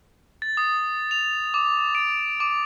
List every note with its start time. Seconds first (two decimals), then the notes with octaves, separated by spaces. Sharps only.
0.42 A6
0.57 D#6
1.11 F7
1.54 D6
1.95 D7
2.40 D6